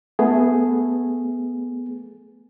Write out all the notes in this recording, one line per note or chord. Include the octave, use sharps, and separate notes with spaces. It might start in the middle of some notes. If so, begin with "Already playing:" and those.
A3 B3 G#4